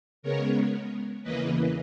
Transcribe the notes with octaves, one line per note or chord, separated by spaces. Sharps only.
C#3 G#3 B3 A#4 C#5
E2 C#3 E3 A#3 B4 D#5